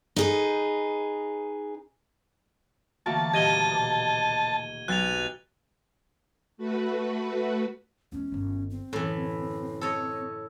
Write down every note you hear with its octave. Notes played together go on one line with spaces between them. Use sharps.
D#4 G#4 B4
D3 E3 A3 A#3 F#4 A5
D#1 A#3 G4 D#5 G#6 D#7 G7
B2 D6
B1 F#6 A6 F7
A3 F#4 B4
E2 G#3 C#4
G1 D#3
C4
F#2 A2 D3 E3
A4 C#5 D#5